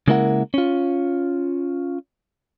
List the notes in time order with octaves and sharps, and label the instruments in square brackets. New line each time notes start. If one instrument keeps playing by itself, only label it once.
[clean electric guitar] C#3 G#3 A#3 E4 A#4 F#5
C#4 F4